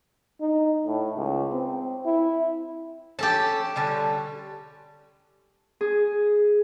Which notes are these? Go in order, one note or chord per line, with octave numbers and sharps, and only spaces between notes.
D#4
A2
C#2
C4
E4
C#4 G4 A4 A5
D3 G3 C#4
G#4